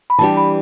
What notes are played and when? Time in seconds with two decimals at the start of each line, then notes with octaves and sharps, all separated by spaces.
0.10 B5
0.18 E3 G3 D4 G4 A5
0.37 B5